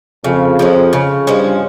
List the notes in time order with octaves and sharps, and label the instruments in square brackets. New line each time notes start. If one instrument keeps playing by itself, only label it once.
[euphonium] F2 [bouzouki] C#3
[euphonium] F2 [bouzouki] F3 G#3 C#4
[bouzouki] C#3
[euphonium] G2 [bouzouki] F3 G#3 C#4